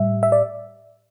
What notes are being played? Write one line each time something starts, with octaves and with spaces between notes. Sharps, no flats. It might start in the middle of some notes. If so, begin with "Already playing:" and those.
Already playing: A2 G3 E5
E5
D5